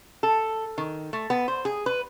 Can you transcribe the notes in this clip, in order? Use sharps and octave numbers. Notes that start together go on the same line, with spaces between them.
A4
D#3
A3
B3
C5
G#4
B4